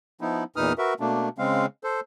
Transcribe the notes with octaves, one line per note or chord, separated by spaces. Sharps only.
F3 B3 D#4 E4
E2 A#2 D#4 B4 D#6 F6
F#4 A#4 B4 E5
B2 A3 A#3 D4
C#3 G#3 C4 F5
A4 C5